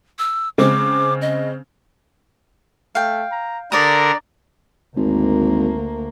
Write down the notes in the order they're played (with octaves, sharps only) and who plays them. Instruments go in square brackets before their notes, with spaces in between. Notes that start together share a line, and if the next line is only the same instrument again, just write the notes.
[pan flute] E6
[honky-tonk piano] C#3 G#3 C4 [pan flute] D6
[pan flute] D#5
[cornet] A3 [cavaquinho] F5 G5
[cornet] A#5
[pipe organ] D3 A#4 [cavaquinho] D5 D#6 [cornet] A#5
[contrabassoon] G#1 [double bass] D2 A#3